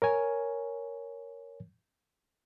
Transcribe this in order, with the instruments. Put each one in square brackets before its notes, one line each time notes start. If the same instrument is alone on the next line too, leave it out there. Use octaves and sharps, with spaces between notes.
[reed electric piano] A#4 C#5 G#5